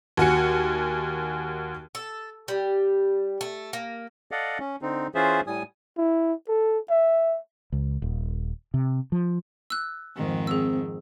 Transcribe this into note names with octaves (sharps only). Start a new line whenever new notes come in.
D#2 F#4 G#5 C#7
A4
G3
A3
A#3
A4 D5 D#5 F5 F#5
C#4
D3 C4 D#4
E3 C#4 F4 G#4 C5 E5
A2 G3 G#5 D#6
E4
A4
E5
C#2
D#1
C3
F3
E6 F#6
F2 G#2 D#3
C4 G#4 E6